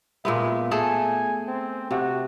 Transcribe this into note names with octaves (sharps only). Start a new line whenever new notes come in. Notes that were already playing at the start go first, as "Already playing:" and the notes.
A#2 G#3 B3 E5
A3 G#4 A4 G#5
C4
C3 F#4